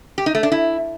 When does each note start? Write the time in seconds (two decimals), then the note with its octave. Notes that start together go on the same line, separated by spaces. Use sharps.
0.18 G4
0.26 D#4
0.35 A3
0.43 D4
0.52 E4